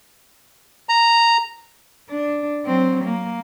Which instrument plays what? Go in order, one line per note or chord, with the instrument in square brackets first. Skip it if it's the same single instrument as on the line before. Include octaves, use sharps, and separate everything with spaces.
[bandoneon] A#5
[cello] D4
F#3 C4
A#3